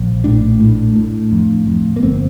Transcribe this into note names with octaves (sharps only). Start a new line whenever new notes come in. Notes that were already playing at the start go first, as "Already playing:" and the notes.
Already playing: A#1
A2 D4
A2
A2
F2
F2
A#3
G1 C4